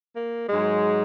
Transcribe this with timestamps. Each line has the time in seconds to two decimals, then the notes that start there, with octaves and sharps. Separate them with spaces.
0.15 A#3
0.49 G#2 F#3 G#3